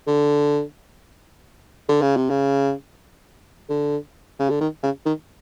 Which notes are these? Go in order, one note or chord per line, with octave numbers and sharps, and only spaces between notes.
D3
D3
C#3
C3
C#3
D3
C#3
D3
D#3
C#3
D#3